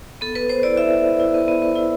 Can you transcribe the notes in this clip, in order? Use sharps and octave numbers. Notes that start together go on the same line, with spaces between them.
B3 A4
B3 B4
B3 C5
E4 D5
E4 E5
E4
B3
E4
B3
B3
B3
E4